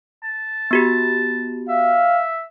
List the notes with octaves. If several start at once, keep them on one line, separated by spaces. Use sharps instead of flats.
A5
B3 F#4 G4
E5 F5